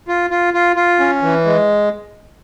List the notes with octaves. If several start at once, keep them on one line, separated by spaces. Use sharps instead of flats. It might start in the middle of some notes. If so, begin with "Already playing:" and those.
F4
F4
F4
F4
C#4
E3
G#3